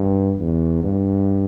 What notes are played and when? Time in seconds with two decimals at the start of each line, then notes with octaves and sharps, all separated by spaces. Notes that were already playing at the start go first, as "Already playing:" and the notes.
Already playing: G2
0.37 E2
0.83 G2